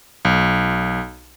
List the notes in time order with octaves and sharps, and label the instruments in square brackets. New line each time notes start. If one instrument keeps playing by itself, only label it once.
[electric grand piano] B1